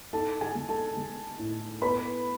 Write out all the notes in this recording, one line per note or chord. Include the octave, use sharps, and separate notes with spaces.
D#4 A4 A5
G#4 G#5
G#3
A4 A5
G#3
A2
B3 B4 B5